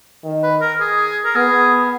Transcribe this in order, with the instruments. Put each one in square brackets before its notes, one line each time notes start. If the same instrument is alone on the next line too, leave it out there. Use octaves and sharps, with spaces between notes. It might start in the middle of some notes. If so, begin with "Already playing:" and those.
[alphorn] D#3
[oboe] B4
A#4
G#4
A#4
[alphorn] B3 [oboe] G#4